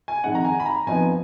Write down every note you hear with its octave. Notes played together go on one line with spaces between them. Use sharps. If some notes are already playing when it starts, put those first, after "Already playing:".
G#5
F2 D#3 G#3 D#4 F#5
A#5
G#5
B5
A#5
F2 F3 B3 D#4 G#5